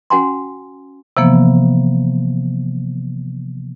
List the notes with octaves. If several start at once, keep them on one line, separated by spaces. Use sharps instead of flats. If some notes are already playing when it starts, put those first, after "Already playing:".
C#4 F#4 F#5 G#5 A#5 C6
C3 E3 F3 A#3 B3